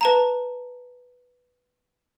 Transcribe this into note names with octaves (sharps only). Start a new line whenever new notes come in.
B4 A5 A#5